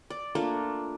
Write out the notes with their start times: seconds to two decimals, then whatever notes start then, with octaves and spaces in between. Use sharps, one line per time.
0.10 D5
0.35 A3 A#3 D4 F4